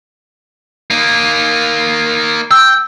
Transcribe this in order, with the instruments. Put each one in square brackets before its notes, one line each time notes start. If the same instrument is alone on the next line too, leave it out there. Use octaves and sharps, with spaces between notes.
[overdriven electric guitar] A#3 D#4
[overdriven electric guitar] G5 [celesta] E6